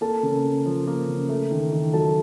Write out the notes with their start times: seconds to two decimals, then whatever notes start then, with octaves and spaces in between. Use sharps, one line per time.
0.01 A#3 A4 A5
0.23 C#3
0.44 C#3
0.66 F3
0.87 A#3
1.08 C#3
1.29 A3
1.51 D#3
1.72 D#3
1.93 F#3 A4 A5